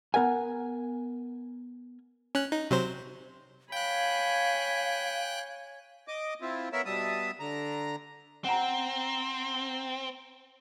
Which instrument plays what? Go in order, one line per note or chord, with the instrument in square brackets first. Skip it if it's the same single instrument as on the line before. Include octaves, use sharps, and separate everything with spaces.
[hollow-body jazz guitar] B3 A#4 F#5 G#5
[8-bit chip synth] C#4 F#6
D#4
C3 F#3 C5
[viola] C#5 G#5 [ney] F5 [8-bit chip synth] G5 F#6 [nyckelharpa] B5
[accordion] D#5 D6
C4 E4 F4
B3 A#4 C#5 E5 B5 E6
B2 G3 E5 A5 D#6
D3 A#5
[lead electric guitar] C4 [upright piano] F#5 A#5